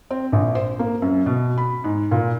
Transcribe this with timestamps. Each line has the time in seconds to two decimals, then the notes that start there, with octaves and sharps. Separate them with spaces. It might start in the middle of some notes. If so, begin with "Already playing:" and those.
0.11 C4
0.32 A#1
0.55 C5
0.79 A#3
1.02 F#2
1.26 B2
1.58 B5
1.84 G#2
2.11 A#2